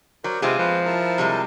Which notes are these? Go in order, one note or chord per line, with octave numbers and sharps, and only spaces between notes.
F#3 A#4 C5 D5
C3 G#3 B3 C4 F4
F3 B4
E4 A#4 A5
C3 G3 G#3